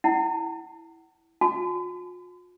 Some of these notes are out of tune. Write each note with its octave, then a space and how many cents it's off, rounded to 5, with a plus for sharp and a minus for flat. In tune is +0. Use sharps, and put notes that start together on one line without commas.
E4 -5 F#5 +30 A5 +0
F4 +45 A5 -45